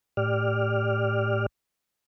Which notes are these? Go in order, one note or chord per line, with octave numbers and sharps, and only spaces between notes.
A2 G4 D5 F6